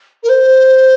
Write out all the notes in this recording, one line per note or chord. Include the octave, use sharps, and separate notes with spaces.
A#4
C5